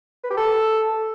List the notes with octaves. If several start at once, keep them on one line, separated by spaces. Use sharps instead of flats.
B4
G4
A4